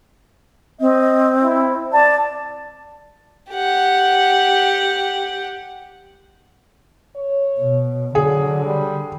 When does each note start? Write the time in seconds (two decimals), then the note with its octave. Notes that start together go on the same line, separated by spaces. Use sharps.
0.81 C4 D#5
1.43 E4
1.93 D5 A5
3.51 G4 F#5
7.15 C#5
7.59 B2
8.15 D3 F#3 G#4
8.66 G3